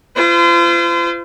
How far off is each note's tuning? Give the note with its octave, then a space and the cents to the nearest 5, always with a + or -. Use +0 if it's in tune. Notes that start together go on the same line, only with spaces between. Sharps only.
F4 -35 C5 -35